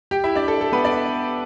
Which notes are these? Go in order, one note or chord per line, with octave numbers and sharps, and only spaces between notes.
G4 G5
E4 E5
D4 D5
A4
A4
B3 B4
D4 D5